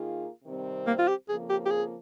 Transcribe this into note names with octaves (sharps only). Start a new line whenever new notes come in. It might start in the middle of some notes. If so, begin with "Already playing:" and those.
Already playing: D#3 A#3 F4 G#4
C3 D#3 G3 C4
A#3
F4
G4
F2 C#3 F3 A#3 G#4
G4
G4
G#4